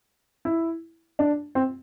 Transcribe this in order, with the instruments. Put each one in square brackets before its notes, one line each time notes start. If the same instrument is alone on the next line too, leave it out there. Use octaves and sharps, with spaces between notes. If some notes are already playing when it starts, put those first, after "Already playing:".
[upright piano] E4
D4
C4